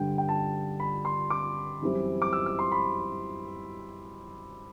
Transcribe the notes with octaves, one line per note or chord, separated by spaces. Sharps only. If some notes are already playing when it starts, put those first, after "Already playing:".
Already playing: G2 D3 G3 G5
G5
A5
B5
C6
D6
F#2 E3 G3 C4 E4
D6
E6
E6
C6
B5